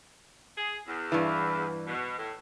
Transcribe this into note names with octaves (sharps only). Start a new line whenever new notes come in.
G#4
E2
G2 E3
B2
A2